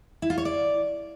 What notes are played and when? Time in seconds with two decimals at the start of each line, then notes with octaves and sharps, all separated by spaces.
0.22 E4
0.30 F4
0.38 C#5
0.45 D5